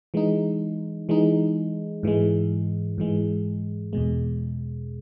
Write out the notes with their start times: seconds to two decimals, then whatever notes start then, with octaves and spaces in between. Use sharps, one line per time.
0.14 E3 G#3 D#4
1.09 E3 G#3 D#4
2.03 G#2 E3 G#3
2.98 G#2 E3 G#3
3.93 E2 B2 G#3